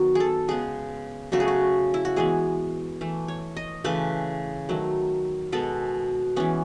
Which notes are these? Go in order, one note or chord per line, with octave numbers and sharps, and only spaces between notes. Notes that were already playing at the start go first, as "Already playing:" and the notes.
Already playing: D#3 F#3 B3 F#4
G#4 A4
C#3 G#3 B3 G#4
C#3 F#3 A3 F#4
G#4
F#4
E4
F#4
E3 G#3 B3 G#4
E3 A3
C#5
D#5
C#3 E3 A3 B4
D#3 F#3 A3
B2 G#3 B3 A4
E3 G#3 B3 C#4